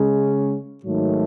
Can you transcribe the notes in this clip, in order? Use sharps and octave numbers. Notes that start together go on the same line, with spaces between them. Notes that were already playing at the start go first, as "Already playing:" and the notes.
Already playing: C#3 G#3 C#4
G#2 D#3 F#3 A3